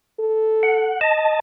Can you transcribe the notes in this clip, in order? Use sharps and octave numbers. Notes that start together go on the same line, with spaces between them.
A4
F#5
D#5 A5